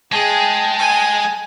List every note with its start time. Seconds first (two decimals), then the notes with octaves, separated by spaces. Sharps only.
0.12 G#3 G#4 G5 A5
0.79 G#5